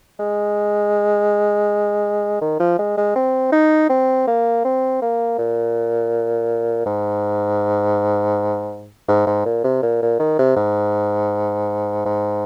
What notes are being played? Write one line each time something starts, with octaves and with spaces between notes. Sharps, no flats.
G#3
D#3
F3
G#3
G#3
C4
D#4
C4
A#3
C4
A#3
A#2
G#2
G#2
G#2
A#2
C3
A#2
A#2
D#3
C3
G#2
G#2